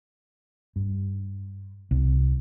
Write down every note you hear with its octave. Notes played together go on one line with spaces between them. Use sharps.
G2
C2